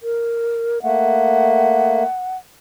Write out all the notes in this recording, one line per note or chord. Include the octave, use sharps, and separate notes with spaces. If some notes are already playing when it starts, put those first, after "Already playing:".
A#4
A3 A#3 F#5